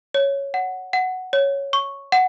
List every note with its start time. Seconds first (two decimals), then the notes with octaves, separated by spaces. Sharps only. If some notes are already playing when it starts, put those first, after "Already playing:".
0.15 C#5
0.54 F#5
0.93 F#5
1.33 C#5
1.73 C#6
2.12 F#5